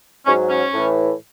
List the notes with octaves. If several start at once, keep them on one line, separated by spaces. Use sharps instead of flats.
G#2 F#3 C#4
C#4
A2 E3